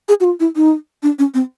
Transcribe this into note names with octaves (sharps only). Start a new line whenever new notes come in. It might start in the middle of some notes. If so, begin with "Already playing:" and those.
G#4
F#4
F4
E4
D#4
D4
C#4
C4